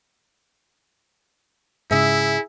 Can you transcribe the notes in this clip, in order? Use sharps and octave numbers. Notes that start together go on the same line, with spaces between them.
G#2 C#3 E4 G#4 E5